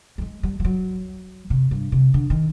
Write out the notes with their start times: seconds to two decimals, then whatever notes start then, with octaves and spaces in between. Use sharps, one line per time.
0.18 G3
0.21 G#3
0.43 G3
0.60 F3
0.65 F#3
1.50 C3
1.71 G2
1.92 C3
2.14 D3
2.30 D#3